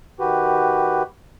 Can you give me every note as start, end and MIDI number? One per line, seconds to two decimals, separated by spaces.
0.20 1.03 51
0.20 1.03 66
0.20 1.03 67
0.20 1.03 71